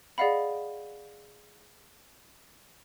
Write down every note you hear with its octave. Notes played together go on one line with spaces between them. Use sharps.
G#4 D5 D#5 F5 F#5 B5